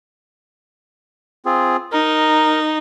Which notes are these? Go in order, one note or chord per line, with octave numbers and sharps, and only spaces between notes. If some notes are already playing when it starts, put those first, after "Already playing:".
C4 F4 G#4
D#4 A#4